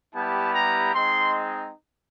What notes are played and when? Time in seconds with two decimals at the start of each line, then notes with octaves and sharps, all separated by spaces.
0.14 G3 B3 E4 G4 A5
0.54 A#5
0.93 G#3 C4 D#4 C6